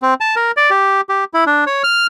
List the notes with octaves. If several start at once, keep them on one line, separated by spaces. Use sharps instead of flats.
C4
A5
A#4
D5
G4
G4
E4
D4
C#5
F6